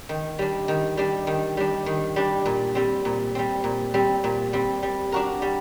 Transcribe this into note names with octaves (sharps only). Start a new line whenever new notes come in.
D#3
G3 D4
D#3
G3 D4
D#3
G3 D4
D#3
G3 D4
A#2
G3 C4
A#2
G3 C4
A#2
G3 C4
A#2
G3 C4
G3
D4 F#4 A#4
G3